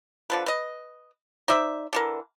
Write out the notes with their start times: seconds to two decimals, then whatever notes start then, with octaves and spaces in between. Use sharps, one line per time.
0.30 D3 F3 B4
0.46 B4 D#5
1.48 D#4 C5 D5 E5
1.93 D3 E3 A#4